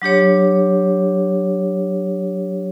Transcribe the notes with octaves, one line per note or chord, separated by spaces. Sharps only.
F#3 D4 G4 C#5